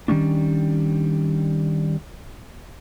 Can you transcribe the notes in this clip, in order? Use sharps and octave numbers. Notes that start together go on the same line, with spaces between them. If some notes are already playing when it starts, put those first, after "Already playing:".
D#3 G3 A#3 C#4 D4